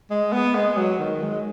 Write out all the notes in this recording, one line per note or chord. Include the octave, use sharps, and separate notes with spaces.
G#3
B3
G#3
F#3
D#3
G#3